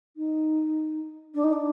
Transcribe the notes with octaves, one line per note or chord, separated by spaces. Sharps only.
D#4
D4
D#4
D4